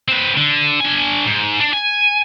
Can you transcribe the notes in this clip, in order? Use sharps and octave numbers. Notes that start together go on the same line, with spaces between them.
C4 B4
D3
D4 G#5
G#2
D4
G#5